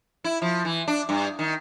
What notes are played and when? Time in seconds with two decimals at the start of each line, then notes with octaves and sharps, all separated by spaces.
0.24 E4
0.42 F3
0.65 E3
0.88 D4
1.09 G2
1.39 D#3